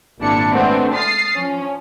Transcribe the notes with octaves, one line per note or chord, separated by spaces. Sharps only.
G#1 A#2 D4 E4 C#7
G#3 A3 B3 C4 D4 F#4
D#6 F6 A6 C7
F3 C#4